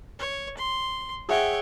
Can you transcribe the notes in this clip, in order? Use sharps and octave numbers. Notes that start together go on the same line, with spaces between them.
C#5
C6
G#4 C#5 E5 F#5 G5